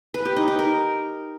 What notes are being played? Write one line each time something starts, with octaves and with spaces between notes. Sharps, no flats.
B4
G4
D#4
D#4
A#4